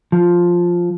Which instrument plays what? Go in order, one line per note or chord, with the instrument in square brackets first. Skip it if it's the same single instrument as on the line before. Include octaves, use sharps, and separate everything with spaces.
[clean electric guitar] F3